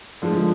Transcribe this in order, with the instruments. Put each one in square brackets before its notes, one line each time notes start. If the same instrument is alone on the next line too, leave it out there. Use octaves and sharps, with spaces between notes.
[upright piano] D3 F3 G#3